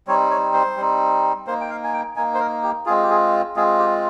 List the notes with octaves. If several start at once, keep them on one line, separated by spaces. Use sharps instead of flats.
G3 C4 D#4 C#5
C#5
C5
G3 C4 D#4
A#3 D#4 C5
G5
F5
G#5
G5
A#3 D#4 G#5
C5
A#4
G4
G#3 C4 F4 G#4
G4
G#4
G#3 C4 F4 G#4
G4